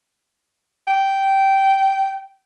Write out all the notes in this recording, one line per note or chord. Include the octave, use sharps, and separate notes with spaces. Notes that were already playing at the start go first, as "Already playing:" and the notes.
G5